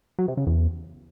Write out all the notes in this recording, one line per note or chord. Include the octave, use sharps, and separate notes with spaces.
F#3
C3
C#3
E2